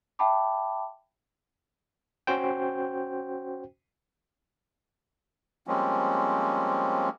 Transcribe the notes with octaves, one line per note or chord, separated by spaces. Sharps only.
E5 F#5 G5 A5 B5 D6
C#4 F#4 C5 G5
F3 G3 G#3 A#3 C4 C#4